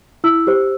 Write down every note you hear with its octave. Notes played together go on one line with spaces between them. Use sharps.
E4 E6
G4 C5